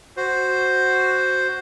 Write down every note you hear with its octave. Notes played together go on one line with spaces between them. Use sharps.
F#4 C5